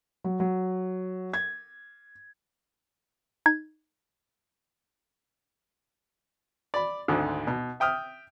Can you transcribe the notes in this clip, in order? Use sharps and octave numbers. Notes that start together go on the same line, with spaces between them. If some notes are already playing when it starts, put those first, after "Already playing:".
F#3
F#3
G#6
D#4 G#6
D5 B5
G#1 D2 D3
B2
E5 G5 D#6 F6